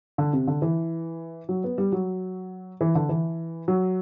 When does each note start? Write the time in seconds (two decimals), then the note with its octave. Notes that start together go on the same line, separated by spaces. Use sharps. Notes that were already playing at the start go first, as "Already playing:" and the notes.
0.18 D3
0.33 C3
0.47 D3
0.62 E3
1.49 F#3
1.64 B3
1.78 G3
1.92 F#3
2.81 E3
2.95 D3
3.09 E3
3.68 F#3